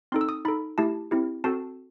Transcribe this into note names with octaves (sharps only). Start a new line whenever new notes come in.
C4 D#4 A4 C6
E6
D#6
D#4 A4 B5
A3 E4 G4 A5
C4 E4 G4
C4 F#4 A4 A5